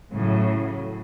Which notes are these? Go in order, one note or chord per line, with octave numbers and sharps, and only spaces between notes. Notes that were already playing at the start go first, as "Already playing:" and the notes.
A2 C#3 F#3